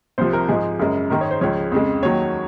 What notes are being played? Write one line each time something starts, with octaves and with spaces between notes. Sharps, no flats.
C2 C3 F3 C5
A#4
G#2 F3 G#3 G#4
F#2 C#3 G#3 A#4
G#2 D#3 G#3 A#4
C#5
C5
C#2 C#3 F3 C#5
F2 C#3 G#3
D#2 D#3 F#3 C#5